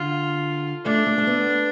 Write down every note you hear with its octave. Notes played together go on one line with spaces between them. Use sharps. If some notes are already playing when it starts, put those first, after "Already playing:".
Already playing: D3 F4
A3 D4
A3
A3
B3